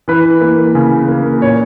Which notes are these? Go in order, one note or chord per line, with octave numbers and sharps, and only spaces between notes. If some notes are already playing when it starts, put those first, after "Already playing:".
E3 B4
A#3
C#3
A#3
A#2 C#5